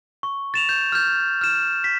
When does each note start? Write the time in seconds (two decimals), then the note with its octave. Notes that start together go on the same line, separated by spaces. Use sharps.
0.23 C#6
0.54 A6 E7 F7
0.69 G6
0.92 F6 G6
1.41 F6 E7
1.84 B6